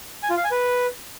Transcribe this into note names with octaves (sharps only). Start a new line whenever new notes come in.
G#5
F4
F5
G#5
B4